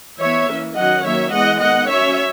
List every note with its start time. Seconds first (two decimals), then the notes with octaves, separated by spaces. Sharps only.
0.20 E3 B3 C#5 E5
0.48 E3 A#3 C#4
0.76 D#3 F#3 C#4 D#5 F#5
1.04 D#3 F#3 A#3 C#4 C#5 E5
1.32 E3 G#3 B3 D#5 F#5
1.60 D#3 G#3 B3 D#5 F#5
1.88 F#3 C#4 C#5 E5